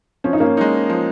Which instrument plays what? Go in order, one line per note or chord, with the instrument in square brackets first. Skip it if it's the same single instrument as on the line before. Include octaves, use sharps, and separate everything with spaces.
[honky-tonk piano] F3 [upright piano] C#4
[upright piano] D#4
A#3 C#4
[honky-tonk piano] G#3 D#4
F3